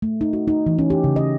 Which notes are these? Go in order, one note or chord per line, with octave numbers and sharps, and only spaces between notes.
A3
D#4
F#4
D#4
E3
C#4
G4
C#3
D#5